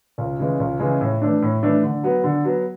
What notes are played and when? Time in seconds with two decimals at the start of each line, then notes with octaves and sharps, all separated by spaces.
0.18 C#2
0.39 C#3 E3 G#3
0.60 C#2
0.80 C#3 E3 G#3
1.01 A2
1.22 E3 A3 D4
1.42 A2
1.63 E3 A3 D4
1.83 D3
2.03 F#3 B3
2.24 D3
2.45 F#3 B3